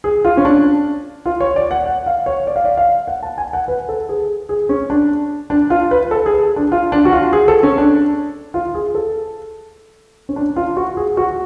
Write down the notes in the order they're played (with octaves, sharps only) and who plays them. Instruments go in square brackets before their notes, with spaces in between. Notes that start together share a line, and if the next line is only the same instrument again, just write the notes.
[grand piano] G#4
F4
C#4
D4
F4
C#5
D5
F#5
F#5
F5
C#5
D5
F5
D5
F5
F#5
A5
G#5
F#5
B4
A4
G#4
G#4
C#4
D4
D4
F4
B4
A4
G#4
D4
F4
D4
F#4
F4
G#4
A4
C#4
D4
F4
G#4
A4
C#4
D4
F4
F#4
G#4
F#4